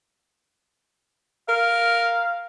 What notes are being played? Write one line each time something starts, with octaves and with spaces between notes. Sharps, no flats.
A#4 F5